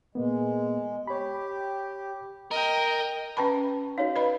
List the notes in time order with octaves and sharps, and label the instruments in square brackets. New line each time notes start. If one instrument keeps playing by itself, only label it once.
[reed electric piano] A#2 A#3 B3 [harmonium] G#3
[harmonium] G4 [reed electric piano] C#5 B5
[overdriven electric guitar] A#4 [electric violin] D#5 G5
[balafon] C#4 B4 B5 [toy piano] G5 A5 C#6
[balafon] D#4 [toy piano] F#4 C#5 F5
[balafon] B4 D#5 B5